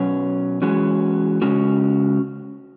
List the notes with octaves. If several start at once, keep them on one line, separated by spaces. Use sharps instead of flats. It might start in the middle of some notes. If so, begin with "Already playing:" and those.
Already playing: B2 F#3 C#4
E3 G#3 C#4 F#4
C#3 G#3 C#4 F#4